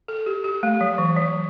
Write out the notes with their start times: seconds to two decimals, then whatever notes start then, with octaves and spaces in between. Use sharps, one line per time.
0.08 A4
0.26 G4
0.44 G4
0.63 A3
0.81 F#3
0.98 E3
1.17 F#3